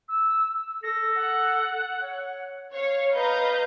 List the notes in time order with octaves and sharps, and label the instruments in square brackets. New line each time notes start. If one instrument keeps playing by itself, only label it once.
[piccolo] E6
[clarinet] A4 [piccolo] A#6
[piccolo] F#5
[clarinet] C#5
[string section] C#5 F5
B4 D#5 F5 A#5 G6